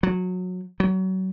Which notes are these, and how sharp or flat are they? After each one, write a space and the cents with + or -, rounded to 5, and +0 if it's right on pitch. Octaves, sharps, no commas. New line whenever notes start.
F#3 -20
F#3 +25